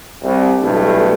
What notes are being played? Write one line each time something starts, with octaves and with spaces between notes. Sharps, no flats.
C2
B1 G2 E3 A3